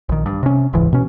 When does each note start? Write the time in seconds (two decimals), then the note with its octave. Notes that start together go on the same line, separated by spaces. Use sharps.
0.09 A#1 D#3
0.26 G2
0.43 C3 C#4
0.73 E1 C#2 G#2 E3
0.93 B2 C#4